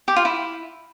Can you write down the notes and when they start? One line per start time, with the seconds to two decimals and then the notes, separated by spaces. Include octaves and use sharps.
0.08 G4
0.16 F4
0.25 E4